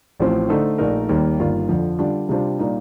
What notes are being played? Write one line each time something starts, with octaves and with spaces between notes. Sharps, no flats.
A1 A2 F3 C4
D3 A3 D#4 A4 C5
A#1 A#2 A3 D#4 A#4
D#2 D#3 G3 A#3
G1 G2 D#3 A#3 F4
F2 D3 F3
D3 G3 D4 F4
C3 G3 D4 F4 C5
A#2 G3 A#3 D#4